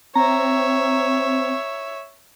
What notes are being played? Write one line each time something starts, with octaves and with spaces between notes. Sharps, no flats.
C4 C#5 E5 A#5